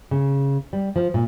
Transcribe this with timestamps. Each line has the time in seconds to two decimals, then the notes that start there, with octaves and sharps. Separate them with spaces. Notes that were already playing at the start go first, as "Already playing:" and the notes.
0.11 C#3
0.73 G3
0.96 F3
1.14 A#2